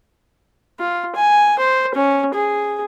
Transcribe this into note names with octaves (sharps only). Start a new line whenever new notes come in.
F4
G#5
C5
C#4
G#4